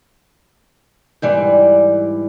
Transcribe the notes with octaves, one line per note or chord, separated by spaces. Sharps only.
G#2 E3 G3 D5